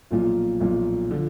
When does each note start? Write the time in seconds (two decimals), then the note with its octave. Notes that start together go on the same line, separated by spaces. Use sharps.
0.11 B1 A#2 F3 F4
0.60 B1 A#2 F3
1.11 D3 F3